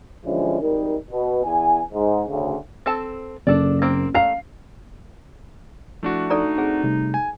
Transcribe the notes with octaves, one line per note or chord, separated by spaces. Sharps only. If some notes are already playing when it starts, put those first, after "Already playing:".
D3 E3 F3 G3 G#3 C#4
G#1 G3 D#4 A#4
B2
E2 G#5
G#2
D2 C#3
C4 A4 A5
F#1 D4 A4 D5
A#3 C4
A3 F5 A#5 C7
F3 A3 D4 E4 F#4
D#4 A4 D5 A#5
C4 G#4 F#5
C3 G3 A3
G#5